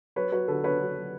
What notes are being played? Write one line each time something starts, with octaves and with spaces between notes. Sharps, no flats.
F#3 B4 C#5
F#3 B4 C#5
D3 A4 B4
D3 B4 C#5
F#3
F#3